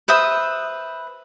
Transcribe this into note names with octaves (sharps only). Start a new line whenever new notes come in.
B4 C5 E5 D#6